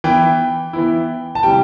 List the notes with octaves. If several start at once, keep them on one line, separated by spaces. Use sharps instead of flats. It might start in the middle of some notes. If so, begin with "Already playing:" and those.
E3 B3 E4 G5
E3 B3 E4
A5
C3 E3 G3 G5